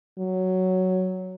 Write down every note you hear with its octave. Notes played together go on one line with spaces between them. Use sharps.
F#3